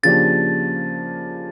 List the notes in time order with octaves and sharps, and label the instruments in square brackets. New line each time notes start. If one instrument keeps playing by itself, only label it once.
[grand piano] C#3 F3 A#3 D4 G4 [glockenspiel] A6